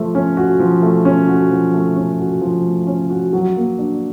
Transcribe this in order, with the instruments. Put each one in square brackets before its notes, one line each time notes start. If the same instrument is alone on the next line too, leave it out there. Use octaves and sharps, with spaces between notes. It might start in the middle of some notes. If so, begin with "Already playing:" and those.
Already playing: [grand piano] F3 A3
C#4
F#4
F3
A3
C#4
F#4
F3
A3
C#4
F#4
F3
A3
C#4
F#4
F#3
A#3
D4